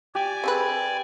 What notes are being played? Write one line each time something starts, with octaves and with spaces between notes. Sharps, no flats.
G4 D5 G#5
C4 G#4 B4